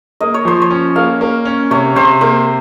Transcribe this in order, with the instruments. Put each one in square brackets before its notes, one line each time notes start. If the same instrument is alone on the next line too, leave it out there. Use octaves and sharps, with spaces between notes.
[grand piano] A#3 [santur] D#5
[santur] C#5
[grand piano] F3 [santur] C5
[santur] C#5
[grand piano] C#4
[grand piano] A#3 [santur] F5
[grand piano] A#3
C#4
[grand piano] C3 [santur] C#5
[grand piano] C3 [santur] C5
[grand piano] A#3 [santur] C5